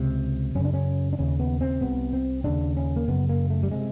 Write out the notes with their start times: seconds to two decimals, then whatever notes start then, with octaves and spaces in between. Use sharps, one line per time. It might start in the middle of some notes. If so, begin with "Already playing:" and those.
Already playing: C#2 C3
0.55 F#2 C#4
0.59 C#3
0.65 D4
0.74 C#4
1.13 D4
1.19 D#2 C#3 C#4
1.40 B3
1.61 C4
1.81 C2 C3 B3
2.13 C4
2.44 D#2 C#3 D4
2.77 C#4
2.96 A#3
3.08 F#2 C#3 B3
3.29 A#3
3.50 A3
3.63 G3
3.71 C3 G#3